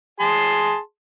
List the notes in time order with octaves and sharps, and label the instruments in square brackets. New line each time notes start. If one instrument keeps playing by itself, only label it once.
[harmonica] G#4 A5 C6